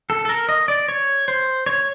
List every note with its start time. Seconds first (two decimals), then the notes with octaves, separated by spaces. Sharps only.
0.10 A4
0.25 A4
0.29 A#4
0.49 D#5
0.68 D5
0.88 C#5
1.28 C5
1.66 C#5